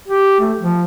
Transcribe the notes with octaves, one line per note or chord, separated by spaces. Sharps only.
G4
A3
F3